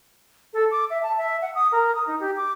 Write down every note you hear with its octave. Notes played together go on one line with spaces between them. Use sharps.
A4
D6
E5
A5
E5
F#5
D#6
A#4
D#6
D#4
G4
D6